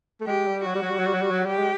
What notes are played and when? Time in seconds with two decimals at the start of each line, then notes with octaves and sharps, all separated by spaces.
0.20 A3
0.27 G#3 G4
0.47 G3
0.66 F#3 F#4
0.75 G3
0.82 F#3
0.91 G3
0.99 F#3
1.07 G3
1.14 F#3
1.22 G3
1.31 F#3
1.46 G3 G4
1.59 G#3